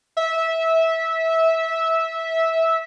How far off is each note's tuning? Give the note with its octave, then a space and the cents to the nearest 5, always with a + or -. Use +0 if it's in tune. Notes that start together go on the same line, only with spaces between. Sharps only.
E5 -15